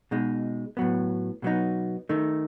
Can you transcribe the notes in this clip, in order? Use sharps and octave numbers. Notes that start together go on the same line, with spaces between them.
B2 G#3 D#4
A2 F#3 B3
B2 F#3 B3 D#4
D#3 A3 D#4